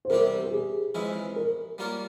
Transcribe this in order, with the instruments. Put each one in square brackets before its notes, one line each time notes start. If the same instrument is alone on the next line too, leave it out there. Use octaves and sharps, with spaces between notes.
[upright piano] C5
[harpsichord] E2 C3 G3 C4 G4 [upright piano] A#4
[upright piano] G4
G#4
[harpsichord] F2 E3 G#3 C#4 E4
[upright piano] A#4
[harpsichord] G3 A#3 F4 A#4 C#5